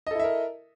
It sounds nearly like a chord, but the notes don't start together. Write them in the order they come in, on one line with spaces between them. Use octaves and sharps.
D#5 A4 E4 E5 A#4